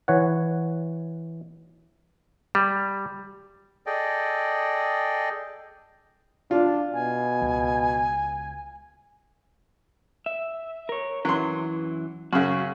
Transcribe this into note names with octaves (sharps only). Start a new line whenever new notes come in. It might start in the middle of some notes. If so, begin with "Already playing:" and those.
E3 C#5 F#5
G3
G#4 A4 D5 D#5 G5
D4 F4
B2 G#5
C#2
E5
A#4 C#5
F#2 E3 F#3 C6
F#2 C#3 F#4